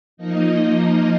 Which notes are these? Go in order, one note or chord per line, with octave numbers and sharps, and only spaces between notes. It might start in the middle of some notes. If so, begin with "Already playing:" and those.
F3 A#3 D#4 D#5